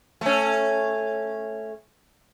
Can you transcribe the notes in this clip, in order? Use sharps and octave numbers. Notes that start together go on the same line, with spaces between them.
A3 C#4